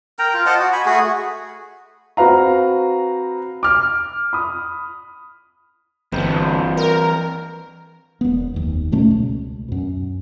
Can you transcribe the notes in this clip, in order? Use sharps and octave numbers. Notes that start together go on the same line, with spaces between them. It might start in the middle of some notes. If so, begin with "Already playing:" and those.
A#4 G5 A#5
F4
C5 D#5 F#5 A5
F#4
G#5 B5
A3 F#4 G#4
C4 F#4 B4 F5 A#5
D6 F6
B5 D#6
G1 E3 C4 C5
A#4
E1 B3
F1 D#2
D1 B2 A3 C#4
C#2
F#2 B2